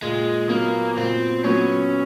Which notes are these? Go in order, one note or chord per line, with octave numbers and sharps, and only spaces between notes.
A#2 G#3
F#3 A#3 B3
A#2 C4
F#3 B3 C#4